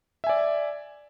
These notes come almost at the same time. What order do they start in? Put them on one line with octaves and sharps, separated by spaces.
E5 G#5 D5